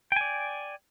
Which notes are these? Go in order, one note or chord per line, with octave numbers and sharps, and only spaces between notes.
D5 G5 G#5